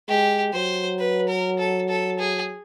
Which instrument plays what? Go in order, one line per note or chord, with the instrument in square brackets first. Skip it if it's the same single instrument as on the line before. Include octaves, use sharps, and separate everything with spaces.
[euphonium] G#3 [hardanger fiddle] G4
[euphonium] F#3 [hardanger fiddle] C5
[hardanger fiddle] B4
A#4
A4
A4
G#4